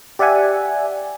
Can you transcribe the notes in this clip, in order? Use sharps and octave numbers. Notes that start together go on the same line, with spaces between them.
G4 D5 E5 F#5 G#5